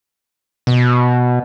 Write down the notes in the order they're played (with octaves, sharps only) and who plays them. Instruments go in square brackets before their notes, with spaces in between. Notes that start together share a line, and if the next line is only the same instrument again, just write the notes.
[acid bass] B2